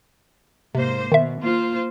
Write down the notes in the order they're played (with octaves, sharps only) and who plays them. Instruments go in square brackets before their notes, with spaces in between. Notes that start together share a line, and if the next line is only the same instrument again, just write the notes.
[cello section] G#2 A#3 C5 [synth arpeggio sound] C3
[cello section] B2 [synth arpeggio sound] D#3 E5
[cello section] A#3 F4 C5